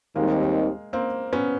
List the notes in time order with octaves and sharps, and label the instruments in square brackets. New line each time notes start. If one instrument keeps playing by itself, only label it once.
[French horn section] D#2 D#3 G3 C4 D#4 [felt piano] G#3 A#3
[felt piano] A#3 C4
B3 C#4